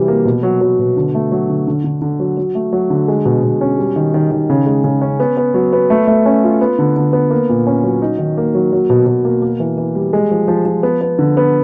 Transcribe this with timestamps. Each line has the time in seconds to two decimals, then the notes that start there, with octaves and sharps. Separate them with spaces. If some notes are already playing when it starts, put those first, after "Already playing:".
Already playing: C3 E3 F#3 G3
0.08 A#3
0.25 B2
0.43 F#3
0.61 F#3
0.79 B2
0.97 D3
1.15 A3
1.32 F#3
1.49 D3
1.67 D3
1.84 D3
2.02 D3
2.20 F#3
2.37 F#3
2.55 A3
2.73 F#3
2.90 D3
3.08 G#3
3.25 B2
3.43 B2
3.61 C#4
3.78 G3
3.96 D#3
4.14 D#3
4.31 D#3
4.50 C#3
4.66 G#3
4.84 C#3
5.01 C#4
5.20 B3
5.37 B3
5.54 F#3
5.73 B3
5.90 A3
6.07 A3
6.26 C#4
6.44 F4
6.61 B3
6.79 D3
6.96 D3
7.13 B3
7.31 A#3
7.49 A#2
7.67 C#4
7.84 F#3
8.02 D#4
8.19 D#3
8.37 A#3
8.55 F#3
8.73 F#3
8.90 B2
9.07 B2
9.25 A#3
9.42 A#3
9.60 E3
9.78 E3
9.95 G3
10.13 G#3
10.31 F3
10.48 F3
10.65 F3
10.83 B3
11.01 B3
11.19 D3
11.37 B3